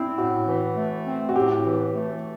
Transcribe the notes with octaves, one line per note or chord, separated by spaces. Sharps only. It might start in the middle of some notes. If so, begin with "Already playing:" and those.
Already playing: C4 D4 E4
A2 F#4
E3
A3
C4
F#4
A2 G4
E3
A3